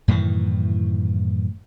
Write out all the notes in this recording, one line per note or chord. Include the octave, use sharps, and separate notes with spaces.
F#2 A2 D#3 E3